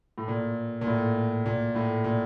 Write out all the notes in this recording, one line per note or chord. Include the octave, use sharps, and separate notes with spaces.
A2
A#2
A#2
A2
A#2
A2
A#2